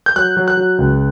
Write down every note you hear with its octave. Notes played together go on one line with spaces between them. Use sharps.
G6
F#3 F#6
F#3
F#6
F#3
C#2